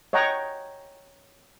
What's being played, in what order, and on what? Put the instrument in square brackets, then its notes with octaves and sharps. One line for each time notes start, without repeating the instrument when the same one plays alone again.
[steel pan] C#5 D#5 F#5 G5 A#5